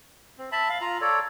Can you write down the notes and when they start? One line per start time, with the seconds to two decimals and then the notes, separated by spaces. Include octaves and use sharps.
0.38 C4
0.52 E5 A5 B5
0.69 F5
0.81 F4 A#5
1.01 A4 C#5 D5